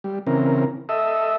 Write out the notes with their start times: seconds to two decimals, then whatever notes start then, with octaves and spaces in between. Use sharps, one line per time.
0.04 G3
0.27 C#3 E3 C4 A#4
0.89 A4 D#5 E5